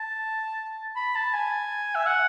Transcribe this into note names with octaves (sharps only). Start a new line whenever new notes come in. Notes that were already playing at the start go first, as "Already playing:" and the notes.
Already playing: A5
B5
A5
G#5
E5
F#5